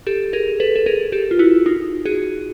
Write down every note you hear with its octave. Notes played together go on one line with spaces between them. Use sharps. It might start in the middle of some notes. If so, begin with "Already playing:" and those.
G4 A4
G#4 A#4
A4 B4
A4
G#4 A#4
G4 A4
F4
E4 F#4
D#4 F4
F#4 G#4